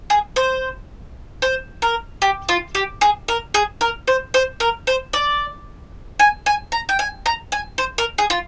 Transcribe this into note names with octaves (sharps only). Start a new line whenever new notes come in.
G#4
C5
C5
A#4
G4
F4
G4
G#4
A#4
G#4
A#4
C5
C5
A#4
C5
D5
G#5
G#5
A#5
G5
G#5
A#5
G#5
C5
A#4
G#4
F4